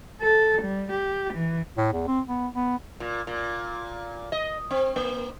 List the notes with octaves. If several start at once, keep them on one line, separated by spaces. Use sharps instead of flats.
A4
G3
G4
E3
A2
E2
C4
B3
B3
A#2
A#2
D#5
C4
A#3